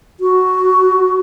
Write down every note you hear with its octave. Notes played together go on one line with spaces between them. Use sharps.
F#4